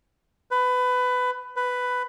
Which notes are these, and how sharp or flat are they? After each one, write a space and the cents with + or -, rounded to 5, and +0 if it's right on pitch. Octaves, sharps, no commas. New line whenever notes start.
B4 +20
B4 +10